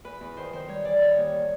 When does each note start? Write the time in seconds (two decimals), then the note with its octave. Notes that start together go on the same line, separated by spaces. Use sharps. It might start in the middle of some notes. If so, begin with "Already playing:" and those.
0.04 E2 B4
0.20 E2
0.37 D#3 C5
0.53 D#3 C5
0.68 G3 C#5
0.85 E3 D5
1.01 D#3 C#5
1.17 D#2